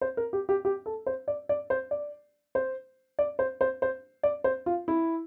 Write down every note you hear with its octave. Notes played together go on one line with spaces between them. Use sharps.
C5
A#4
G4
G4
G4
A4
C5
D5
D5
C5
D5
C5
D5
C5
C5
C5
D5
C5
F4
E4